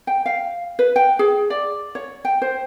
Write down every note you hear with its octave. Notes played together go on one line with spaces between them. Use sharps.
G5
F5
B4
G5
G#4
D5
C#5
G5
C5